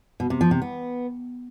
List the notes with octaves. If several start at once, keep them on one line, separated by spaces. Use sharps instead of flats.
B2
C3
F3
C3
B3